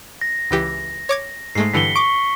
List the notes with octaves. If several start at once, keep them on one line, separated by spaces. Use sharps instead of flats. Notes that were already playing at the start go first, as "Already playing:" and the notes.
A#6
C#2 E3 G4
C#5 D6 G#6
G#2 G#3 A3 C7
G2 D3 E3 B6 C#7 G7
C#6 D6 D7